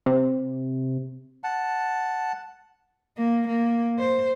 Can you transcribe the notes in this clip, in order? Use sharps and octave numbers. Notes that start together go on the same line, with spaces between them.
C3
F#5 A5
A#3
A#3
C5